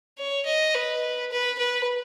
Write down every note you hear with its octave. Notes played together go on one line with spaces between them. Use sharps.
C#5
D#5
B4
B4
B4